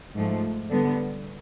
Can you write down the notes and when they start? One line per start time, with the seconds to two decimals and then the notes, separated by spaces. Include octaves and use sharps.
0.14 G#2 F3 A3
0.69 D3 G3 B3